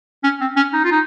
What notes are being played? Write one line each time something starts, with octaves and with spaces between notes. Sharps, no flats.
C#4
C4
C#4
D#4
F4
D#4